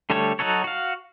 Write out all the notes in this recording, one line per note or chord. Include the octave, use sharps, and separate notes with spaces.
D3 G3 A3 A4 C#5
F#3 D#4 F#4 A4 C#5
F#4 F5